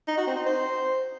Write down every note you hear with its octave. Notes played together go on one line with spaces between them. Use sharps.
D#4
F#4
C4
D#4
C5